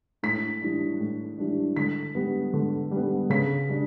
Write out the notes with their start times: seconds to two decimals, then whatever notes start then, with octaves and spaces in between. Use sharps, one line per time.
0.23 A2 B6
0.61 E3 G3 D4
1.00 A2
1.38 E3 G3 D4
1.76 D3 B6
2.15 G3 B3
2.54 D3
2.91 G3
2.97 B3
3.30 C#3 B6
3.69 G3 D4